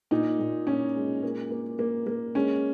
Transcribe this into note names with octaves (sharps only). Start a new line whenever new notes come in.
A#2 D#4
A#2
A#2 C#4
G#3
A#3
A#3
A#3
A#3
G#3 C#4